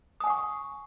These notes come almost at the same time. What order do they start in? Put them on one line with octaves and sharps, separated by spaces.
D#6 G#5 F#5 C#6